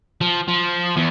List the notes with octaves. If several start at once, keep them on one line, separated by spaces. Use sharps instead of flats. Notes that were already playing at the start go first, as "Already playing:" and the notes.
F3
F3
E2